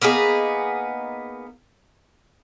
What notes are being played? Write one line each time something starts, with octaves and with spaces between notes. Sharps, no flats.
A#3 B3 D#4 G#4